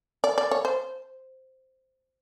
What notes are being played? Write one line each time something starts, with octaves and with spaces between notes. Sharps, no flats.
D5
D5
C#5
C5